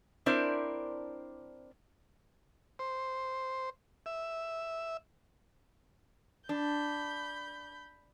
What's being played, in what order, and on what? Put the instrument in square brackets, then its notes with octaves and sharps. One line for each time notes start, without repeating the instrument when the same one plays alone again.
[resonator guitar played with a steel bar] C4 D4 E4 A#4 C5 D5
[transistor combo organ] C5
E5
[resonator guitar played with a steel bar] D4 [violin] B5 G6